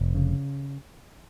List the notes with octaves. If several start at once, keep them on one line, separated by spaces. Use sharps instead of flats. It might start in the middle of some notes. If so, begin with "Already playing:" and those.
Already playing: F1
C#3